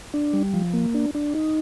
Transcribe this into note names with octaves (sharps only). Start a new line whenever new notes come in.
D4
G3
F3
A#3
D4
D4
D#4